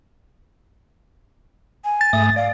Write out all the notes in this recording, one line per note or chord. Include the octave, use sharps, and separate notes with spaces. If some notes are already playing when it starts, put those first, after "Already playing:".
G#5
A6
G#2 A3 D#6
D5 F5